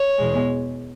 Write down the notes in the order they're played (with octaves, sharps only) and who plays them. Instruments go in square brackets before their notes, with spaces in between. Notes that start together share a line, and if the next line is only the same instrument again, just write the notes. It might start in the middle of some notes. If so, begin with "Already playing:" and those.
Already playing: [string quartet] C#5
E2 B2 G#3